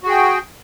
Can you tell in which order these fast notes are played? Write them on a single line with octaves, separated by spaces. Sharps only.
F#4 G#4 G5